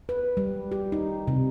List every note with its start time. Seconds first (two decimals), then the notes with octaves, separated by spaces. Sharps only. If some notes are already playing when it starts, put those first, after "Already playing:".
0.09 B4
0.37 G3
0.72 G4
0.92 D#4
1.27 C3